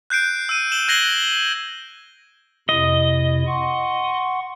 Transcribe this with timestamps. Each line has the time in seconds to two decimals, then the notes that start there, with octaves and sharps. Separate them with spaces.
0.10 F#6 G6 C7 D7
0.49 E6 D#7
0.72 E7 F#7 G7
0.88 F#6 G#6 A#6 C7 F#7 G7
2.69 F2 C3 E4 D#5
3.47 F#5 C6 C#6